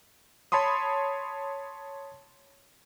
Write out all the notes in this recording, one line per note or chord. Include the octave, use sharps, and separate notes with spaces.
C#5 A5 B5 C6 D#6